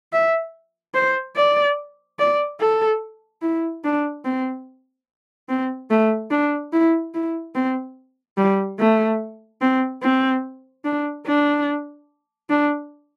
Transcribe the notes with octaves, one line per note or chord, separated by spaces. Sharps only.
E5
C5
D5
D5
A4
E4
D4
C4
C4
A3
D4
E4
E4
C4
G3
A3
C4
C4
D4
D4
D4